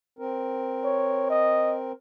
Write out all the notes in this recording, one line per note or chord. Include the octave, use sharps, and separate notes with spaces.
C4 A#4
C#5
D#5